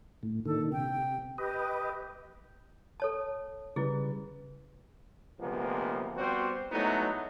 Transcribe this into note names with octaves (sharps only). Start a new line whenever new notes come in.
A2
A#2 D3 D#3 A4
C3 G5
G4 B4 D#5
A4 C#5 A5
C#3 G3 E4 G#4 B4
D2 C3 F3 G#3 A#3 B3
G3 B3 C4 F#4 C5
F#3 G#3 A3 B3 D#4 E4